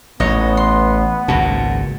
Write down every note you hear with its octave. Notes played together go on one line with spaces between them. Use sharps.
A1 B3 D#4 C#5 D#5
C6
G#1 C#2 A#2 F#4 A5